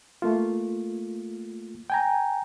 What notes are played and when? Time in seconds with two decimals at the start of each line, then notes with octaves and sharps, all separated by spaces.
0.22 A3 A#3 F4
1.90 G5 G#5 A#5